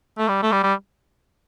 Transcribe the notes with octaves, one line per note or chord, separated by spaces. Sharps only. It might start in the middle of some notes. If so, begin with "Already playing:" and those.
A3
G3
A3
G3
G3